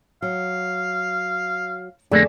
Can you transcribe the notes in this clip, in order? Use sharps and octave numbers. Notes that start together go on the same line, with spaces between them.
F#3 F5
F2 D3 A3 A#3 G#4 D5